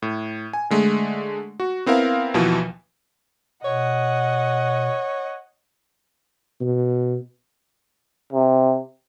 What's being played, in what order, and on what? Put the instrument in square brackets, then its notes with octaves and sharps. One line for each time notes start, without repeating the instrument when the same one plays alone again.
[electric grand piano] A2
G#5
D3 G#3 A3
F#4
B3 C4 E4 A#4 F5
D#2 B2 E3 F3
[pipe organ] B2 [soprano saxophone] C#5 [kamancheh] D#5 F#5
[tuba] B2
[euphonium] C3